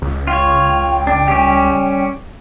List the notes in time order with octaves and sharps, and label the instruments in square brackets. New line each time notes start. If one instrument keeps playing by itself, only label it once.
[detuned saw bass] C#2
[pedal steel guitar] F4 C#5 [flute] G5
[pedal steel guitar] D4
G3 C#4 G4